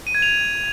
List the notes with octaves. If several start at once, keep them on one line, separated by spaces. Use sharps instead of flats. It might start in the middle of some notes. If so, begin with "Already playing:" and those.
D#7
G#6
F7